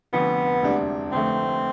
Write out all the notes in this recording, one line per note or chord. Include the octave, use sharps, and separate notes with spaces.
F1 F2 D3 B3
E1 D2 C3 G3 D4
F1 F2 D3 A3 C4